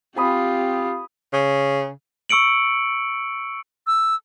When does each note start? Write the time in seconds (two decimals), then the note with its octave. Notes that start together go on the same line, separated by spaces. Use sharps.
0.16 C4 F4 G4 G#5 B5 D#6
1.33 C#3
2.29 C#6 E6 C#7 D7 F#7
3.87 E6